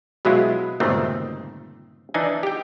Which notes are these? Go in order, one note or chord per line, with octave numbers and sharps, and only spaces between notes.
B2 F#3 G#3 E4 F4
G1 C#2 A#2 D#3 A3 C4
E3 D4 D#4 G#5
G4 G5